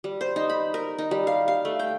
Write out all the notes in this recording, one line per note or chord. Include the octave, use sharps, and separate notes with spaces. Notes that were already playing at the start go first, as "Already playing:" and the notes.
G3
C5
D#4
B5
A#4
D#4
G3
F5
F5
A3
G5